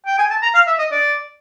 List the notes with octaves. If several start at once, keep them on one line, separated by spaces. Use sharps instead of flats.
G5
G#5
A5
A#5
F5
E5
D#5
D5